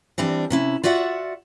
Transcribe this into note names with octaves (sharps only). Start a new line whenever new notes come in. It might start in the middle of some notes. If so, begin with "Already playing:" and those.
E3 G3 C4 D4
C3 C#4 E4
F4 F#4 D5 E5 F#5